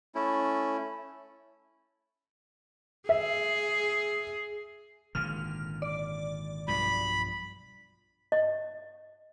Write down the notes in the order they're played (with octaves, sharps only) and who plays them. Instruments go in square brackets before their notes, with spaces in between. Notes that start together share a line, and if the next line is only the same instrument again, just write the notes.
[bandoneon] A3 C#4 E4
[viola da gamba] G#4 [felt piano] E5
[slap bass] G#1 A#2 D3 [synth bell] F6
[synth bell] D5
[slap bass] B1 G2 F3 [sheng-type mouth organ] B5
[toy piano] D#5